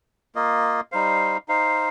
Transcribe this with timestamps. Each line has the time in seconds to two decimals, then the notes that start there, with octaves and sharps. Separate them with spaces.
0.35 A#3 F4 D#5
0.92 G3 D#4 C5 F5
1.48 D#4 C5 F5